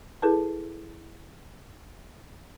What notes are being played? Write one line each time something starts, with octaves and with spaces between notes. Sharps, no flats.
E4 G#4 A4 B4 A5